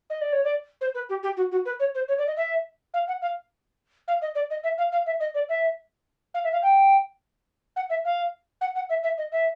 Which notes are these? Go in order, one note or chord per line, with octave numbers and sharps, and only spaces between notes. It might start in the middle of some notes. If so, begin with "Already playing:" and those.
D#5
D5
C#5
D5
C5
B4
G4
G4
F#4
F#4
B4
C#5
C5
C#5
D5
D#5
E5
F5
F#5
F5
F5
D#5
D5
D#5
E5
F5
F5
E5
D#5
D5
E5
F5
E5
F5
G5
F#5
E5
F5
F#5
F#5
E5
E5
D#5
E5